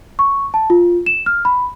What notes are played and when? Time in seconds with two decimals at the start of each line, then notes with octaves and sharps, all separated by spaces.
0.19 C#6
0.54 A5
0.70 F4
1.06 E7
1.26 F6
1.45 B5